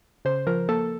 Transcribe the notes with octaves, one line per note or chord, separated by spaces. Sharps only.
C#3 C5
F3 A#4
A#3 A4